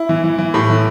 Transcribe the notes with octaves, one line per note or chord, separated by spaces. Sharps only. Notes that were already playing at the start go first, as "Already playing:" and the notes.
Already playing: E4
E3
E3
E3
A2
E3